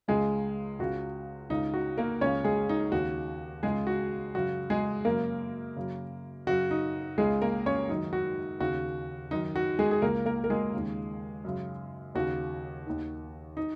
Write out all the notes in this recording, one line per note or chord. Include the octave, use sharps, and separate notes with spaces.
C#2 C#3 G#3 G#4
C#2 C#3 F#4
C#2 C#3 D#4
F#4
A#3 A#4
C#2 C#3 C#4 C#5
G#3 G#4
D#4
D#2 C#3 F#4
C#2 C#3 G#3 G#4
F#4
F#2 C#3 F#4
G#3 G#4
F#2 C#3 A#3 A#4
F#2 C#3
F#2 C#3 F#4
D#4
C#2 C#3 G#3 G#4
A#3 A#4
C#4 C#5
F#2 D#3 D#4
F#4
D#2 C#3 F#4
F#2 D#3 D#4
F#4
G#3 G#4
G#4
C#2 C#3 A#3 A#4
A#3 A#4
A#4
G#3 G#4
D#2 C#3
F#2 C#3
D#2 C#3 F#4
D#2 D#3
D#4